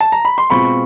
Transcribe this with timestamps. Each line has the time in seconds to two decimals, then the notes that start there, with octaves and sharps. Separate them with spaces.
0.00 A5
0.12 A#5
0.25 B5
0.38 C6
0.50 B2 G#3 C4 F4 B5 C#6